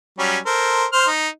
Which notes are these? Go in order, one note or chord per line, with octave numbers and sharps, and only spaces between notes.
F#3 G3 C#4
A4 A#4 C5
C5 F6
D#4